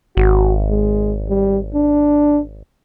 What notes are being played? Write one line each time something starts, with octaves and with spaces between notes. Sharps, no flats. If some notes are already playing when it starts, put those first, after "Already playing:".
G#1 F#4
G#3
G3
D4